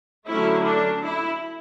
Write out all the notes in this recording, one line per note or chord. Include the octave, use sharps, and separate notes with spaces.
D3 F#3 A3 C#4 E4
D4
E4